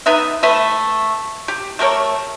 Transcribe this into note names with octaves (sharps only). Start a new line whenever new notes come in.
B3 D#4 B4 E5
A3 B4 E5
G4
A3 G4 A#4 C#5